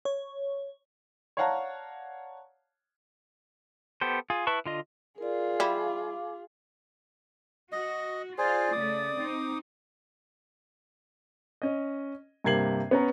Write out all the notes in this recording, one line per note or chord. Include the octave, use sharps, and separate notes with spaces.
C#5
C#5 D5 F5 F#5 A5 A#5
B3 G4 A4 C5
F4 G#4
E4 B4 A5 C#6
D3 F4 D#5
F4 G#4 A#4 D5
G3 E4 F5 D6
F#4 D#5
F4 G#4 C5 D5
C#3 A3 D6 D#6
C4 D#4
C#4 D#5
G2 C3 A#3 G#6 C7 F#7
B3 C#4 A#5